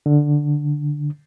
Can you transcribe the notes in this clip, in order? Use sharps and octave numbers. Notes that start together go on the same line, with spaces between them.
D3